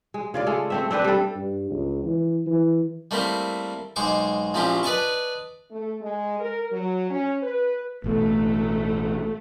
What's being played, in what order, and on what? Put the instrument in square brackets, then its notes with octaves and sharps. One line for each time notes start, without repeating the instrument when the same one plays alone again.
[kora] G#3
C#3 F4 D5
G#3 A3
A3 C4 E5
C4 D4 B4 D5
G3 A4
[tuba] G2
C#2
E3
E3
[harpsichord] G3 A3 A#3 C4 E4
B1 G#3 C5 C#6 D6
A#1 F3 C4 C#4 E4 G4
B4 D5 D#5 A5 C#6
[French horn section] A3
G#3
A#4
F#3
C#4
B4
[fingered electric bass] A1 B2 [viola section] A3